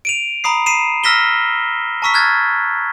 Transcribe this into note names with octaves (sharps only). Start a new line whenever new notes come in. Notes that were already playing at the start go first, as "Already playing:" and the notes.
D7 D#7 F7
A#5 B5 D#6 C7
B5 C7 D#7 E7
E6 F6 A#6 B6 E7 G7
A5 A#5 C#6 E6 B6
F6 F#6 G#6 A6